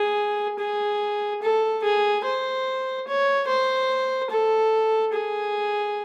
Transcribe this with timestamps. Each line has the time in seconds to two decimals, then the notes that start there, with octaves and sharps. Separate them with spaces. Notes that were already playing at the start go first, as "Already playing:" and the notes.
Already playing: G#4
0.59 G#4
1.42 A4
1.84 G#4
2.25 C5
3.07 C#5
3.48 C5
4.31 A4
5.13 G#4